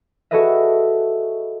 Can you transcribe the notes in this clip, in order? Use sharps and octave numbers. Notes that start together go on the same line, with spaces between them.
F#4 G#4 A4 B4 D#5 E5